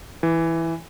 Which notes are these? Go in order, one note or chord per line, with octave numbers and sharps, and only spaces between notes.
E3